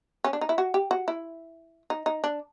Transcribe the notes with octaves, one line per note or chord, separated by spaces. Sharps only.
C#4
D4
D#4
E4
F#4
G4
F#4
E4
D#4
D#4
D4